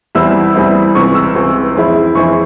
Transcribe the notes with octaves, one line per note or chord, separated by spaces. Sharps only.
E2 E3 G3 C4 E4 E6
E2 E3 G3 C4 E4
C#2 C3 E3 C#6
E6
C#2 C3 E3
F2 E3 G#3 C4 E4
F2 E3 G#3 C4 E4 C#6